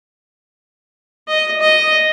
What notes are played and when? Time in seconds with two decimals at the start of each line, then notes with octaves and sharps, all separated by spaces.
1.28 D#5
1.60 D#5